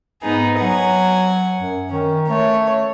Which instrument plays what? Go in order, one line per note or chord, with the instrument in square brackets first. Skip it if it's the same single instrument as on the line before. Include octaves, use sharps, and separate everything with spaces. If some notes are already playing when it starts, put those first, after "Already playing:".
[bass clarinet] G#2 [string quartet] B3 D#4 G#4
[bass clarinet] F#3 [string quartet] F#5 G#5
[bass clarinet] F#2
[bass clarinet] D#3 [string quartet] C#4
[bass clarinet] A3 [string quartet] C#5